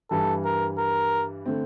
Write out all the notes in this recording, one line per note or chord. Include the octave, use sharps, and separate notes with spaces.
G2 E3 G3 A4
A#4
A#4
D3 A3 C4